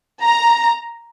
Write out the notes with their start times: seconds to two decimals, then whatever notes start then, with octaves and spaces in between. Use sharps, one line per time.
0.22 A#5